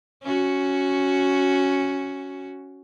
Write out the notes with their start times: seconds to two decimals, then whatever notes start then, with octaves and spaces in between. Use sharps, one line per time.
0.23 C#4 F#4